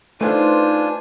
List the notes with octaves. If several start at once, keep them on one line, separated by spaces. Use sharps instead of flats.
A3 D4 D#4 F4 B4 C5 G#5